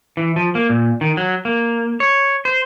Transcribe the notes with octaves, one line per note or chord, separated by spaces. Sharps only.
E3
F3
A#3
A#2
D#3
F#3
A#3
C#5
C5